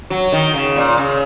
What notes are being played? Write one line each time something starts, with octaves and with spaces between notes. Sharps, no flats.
F#3
D#3
C#3
A#2
C#3